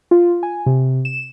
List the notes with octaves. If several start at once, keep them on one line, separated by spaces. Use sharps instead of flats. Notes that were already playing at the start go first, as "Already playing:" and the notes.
F4
G#5
C3
E7